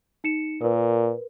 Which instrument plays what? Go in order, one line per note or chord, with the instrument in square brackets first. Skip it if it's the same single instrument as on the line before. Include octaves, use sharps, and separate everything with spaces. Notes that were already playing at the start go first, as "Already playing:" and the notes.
[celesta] D#4 C#7 E7
[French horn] A#2 [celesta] A#4 B4